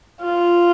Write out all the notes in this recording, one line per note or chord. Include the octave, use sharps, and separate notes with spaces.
F4